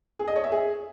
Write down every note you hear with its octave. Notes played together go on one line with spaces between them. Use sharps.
G#4
D#5
C#5
E5
G#4